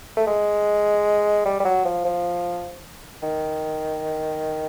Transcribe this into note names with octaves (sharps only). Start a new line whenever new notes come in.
A3
G#3
G3
G3
F#3
F3
F3
D#3